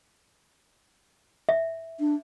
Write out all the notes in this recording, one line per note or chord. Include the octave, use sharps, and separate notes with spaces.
E5
D4